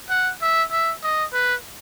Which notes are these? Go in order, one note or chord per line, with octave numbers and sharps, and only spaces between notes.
F#5
E5
E5
D#5
B4